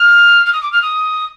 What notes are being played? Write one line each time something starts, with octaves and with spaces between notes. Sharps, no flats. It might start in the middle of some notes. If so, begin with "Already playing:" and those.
Already playing: F6
F6
D#6
D6
F6
D#6